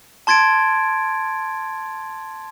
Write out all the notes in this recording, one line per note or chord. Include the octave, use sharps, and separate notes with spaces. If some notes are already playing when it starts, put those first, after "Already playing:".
A5 C6 G#6 A6 D7